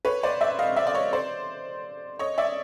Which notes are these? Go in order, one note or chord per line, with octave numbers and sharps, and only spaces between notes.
B4 C#5
C5 D5
D5 E5
D#5 F5
D5 E5
D5
C#5 D#5
C5 D5
C#5 D#5
D5 E5